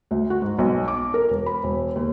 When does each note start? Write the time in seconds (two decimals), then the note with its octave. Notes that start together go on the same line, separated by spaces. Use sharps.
0.11 D2
0.30 F#4
0.42 G#2
0.58 B1
0.88 D6
1.14 A#4
1.30 E1
1.46 B5
1.63 E1
1.96 D#2